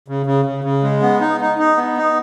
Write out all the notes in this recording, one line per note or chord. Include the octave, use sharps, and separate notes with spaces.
C#3
C#3
C#3
C#3
G#3
B3
D#4
D#4
D#4
B3
D#4